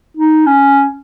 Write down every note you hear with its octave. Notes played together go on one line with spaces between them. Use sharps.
D#4
C#4